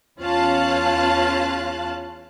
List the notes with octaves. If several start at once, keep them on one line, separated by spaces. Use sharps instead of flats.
E2 C#4 F4 F5 A5 F#6